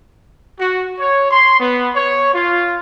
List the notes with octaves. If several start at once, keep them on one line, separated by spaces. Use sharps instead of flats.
F#4
C#5
C6
B3
C#5
F4